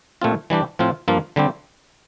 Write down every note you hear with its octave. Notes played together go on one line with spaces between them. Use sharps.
A#2 A3 C4 F4
E3 G3 D4 G4
A2 F3 C4 F4
G2 F3 A#3 F4
D3 G3 C4 G4